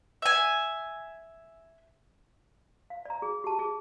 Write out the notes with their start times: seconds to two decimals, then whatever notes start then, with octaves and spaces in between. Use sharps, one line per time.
0.22 E5 G#5
2.90 F5
3.05 D5 A#5
3.22 G#4
3.44 G4 A5
3.59 G#4